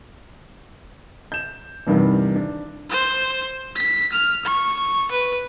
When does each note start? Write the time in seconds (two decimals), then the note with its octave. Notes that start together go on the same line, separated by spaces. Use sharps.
1.32 G6 E7
1.87 E2 G2 C3 D#3 G3
2.36 D4
2.90 C5
3.76 B6
4.12 F6
4.45 C#6
5.11 B4